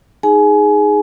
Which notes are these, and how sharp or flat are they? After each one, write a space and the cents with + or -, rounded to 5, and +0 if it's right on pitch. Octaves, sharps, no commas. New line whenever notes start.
D#4 +0 G#4 +0 G#5 +25